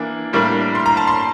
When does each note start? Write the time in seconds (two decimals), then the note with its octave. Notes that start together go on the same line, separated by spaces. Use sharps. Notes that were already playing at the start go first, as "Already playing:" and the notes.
Already playing: E3 A#3 D4
0.33 A2 G3 A#3 D4
0.75 C6
0.86 A#5
0.97 A5
1.07 C6